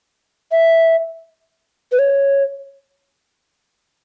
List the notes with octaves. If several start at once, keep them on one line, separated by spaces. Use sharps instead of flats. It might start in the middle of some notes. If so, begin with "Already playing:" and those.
E5
B4
C#5